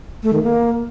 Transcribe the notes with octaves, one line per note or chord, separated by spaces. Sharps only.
A3
D#3
A#3